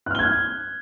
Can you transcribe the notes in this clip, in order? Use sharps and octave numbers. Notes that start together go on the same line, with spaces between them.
F6 F#6 G#6 G7